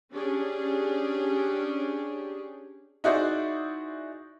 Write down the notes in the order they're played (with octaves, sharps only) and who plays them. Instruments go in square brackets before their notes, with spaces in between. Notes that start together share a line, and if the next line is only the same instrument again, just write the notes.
[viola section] C#4 D4 G4 G#4
[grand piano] D#4 E4 F#4 G#4 C5 D5